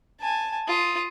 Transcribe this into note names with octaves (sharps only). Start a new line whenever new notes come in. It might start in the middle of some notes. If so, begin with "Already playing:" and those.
G#5 A5
F4 D#6